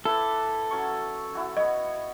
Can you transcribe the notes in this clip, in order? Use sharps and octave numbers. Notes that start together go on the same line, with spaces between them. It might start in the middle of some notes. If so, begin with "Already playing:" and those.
E4 A4 B4 D6
F#3 C#4 C#6
E4 F#4 G#5
B3 C#5 D#5